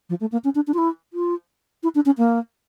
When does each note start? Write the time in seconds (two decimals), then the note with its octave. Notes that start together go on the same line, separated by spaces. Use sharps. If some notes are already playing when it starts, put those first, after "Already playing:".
0.09 F3
0.20 A3
0.32 A#3
0.44 C#4
0.55 D4
0.67 D4
0.74 F4
0.78 E4
1.13 F4
1.83 E4
1.95 D4
2.06 C#4
2.18 A#3